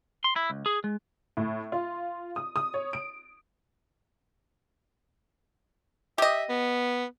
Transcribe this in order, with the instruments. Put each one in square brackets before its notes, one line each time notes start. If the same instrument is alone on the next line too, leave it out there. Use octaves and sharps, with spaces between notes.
[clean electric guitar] C6
E4
C#2
G#4
G#3
[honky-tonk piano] A2
F4
D#6
D#6
C#5
D7
[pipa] G4 D#5 [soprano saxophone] E5
[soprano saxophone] B3